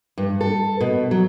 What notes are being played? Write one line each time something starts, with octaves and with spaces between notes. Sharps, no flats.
G2
A4
B2
F#3